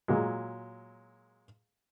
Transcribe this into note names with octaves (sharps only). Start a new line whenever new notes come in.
A#2 F#3 G#3